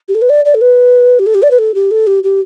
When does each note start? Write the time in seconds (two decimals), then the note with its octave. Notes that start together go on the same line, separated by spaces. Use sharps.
0.08 G4
0.14 A4
0.21 B4
0.29 D5
0.45 D5
0.54 A4
0.61 B4
1.19 G4
1.26 A4
1.34 G4
1.42 D5
1.50 B4
1.58 A4
1.74 G4
1.91 A4
2.07 G4
2.23 G4